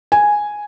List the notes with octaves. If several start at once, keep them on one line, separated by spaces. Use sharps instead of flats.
G#5